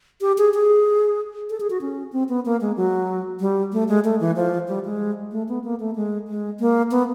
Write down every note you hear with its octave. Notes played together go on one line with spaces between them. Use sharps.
G4
G#4
G#4
A4
G#4
F#4
C#4
C4
B3
A#3
G#3
F#3
G3
A3
G#3
A3
E3
F3
G3
G#3
A3
B3
A#3
A3
G#3
G#3
A#3
B3